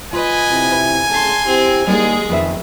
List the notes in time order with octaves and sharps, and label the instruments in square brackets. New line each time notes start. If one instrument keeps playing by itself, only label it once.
[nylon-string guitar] F4 [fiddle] B4 D#5 [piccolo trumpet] G#5
[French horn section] C3 E4
[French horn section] C#3 A3 G#4 [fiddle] A5 C6
[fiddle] C4 [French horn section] E4 G4
[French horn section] D#2 [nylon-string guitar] G3 A#3 [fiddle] G#3 G#4
[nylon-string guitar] F2 B4 E5 [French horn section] D#3 B3